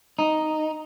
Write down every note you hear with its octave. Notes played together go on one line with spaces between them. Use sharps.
D#4